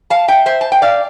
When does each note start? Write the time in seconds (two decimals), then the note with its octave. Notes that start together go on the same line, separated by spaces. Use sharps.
0.10 F5 A5
0.28 E5 G5
0.46 C5 E5
0.61 A5
0.72 G5
0.82 D5 F5